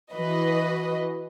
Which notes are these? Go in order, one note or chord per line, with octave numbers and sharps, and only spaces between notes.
E3 F#4 B4 D#5